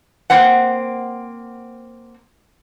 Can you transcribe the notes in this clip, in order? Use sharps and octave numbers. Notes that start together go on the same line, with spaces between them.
A#3 C4 F#5